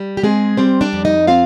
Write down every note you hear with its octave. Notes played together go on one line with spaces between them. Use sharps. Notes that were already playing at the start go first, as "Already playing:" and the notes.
Already playing: G3
G4
G#3 C4 G#4
G3 C4 C5
D4 D5
F2
D#4 D#5
C4 F4 F5